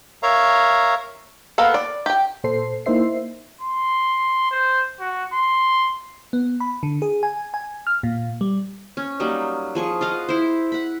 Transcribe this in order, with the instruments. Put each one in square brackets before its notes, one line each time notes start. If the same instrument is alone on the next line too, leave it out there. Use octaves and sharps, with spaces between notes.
[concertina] A#4 C#5 E5 F5 A#5
[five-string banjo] A#3 B3 A4 F5
D5
G4 G5
[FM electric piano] A#2 A4 C5 C7
A#3 D#4 E4 C5 E5 C7
[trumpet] C6
C5
F#4
C6
[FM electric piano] B3
B5
D3
G#4
G#5
G#5
F6
A#2
G3
[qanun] C#4
F#3 G3 A#3 D#4
F3 G#4 C#6
F4 D#5 F5 F#5
E4 C5
F#5 B5